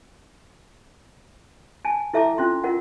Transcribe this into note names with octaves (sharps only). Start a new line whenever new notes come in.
G#5 A5
E4 A4 E5 A5 A#5 D6
C#4 F4 C6
F4 A#4 F#5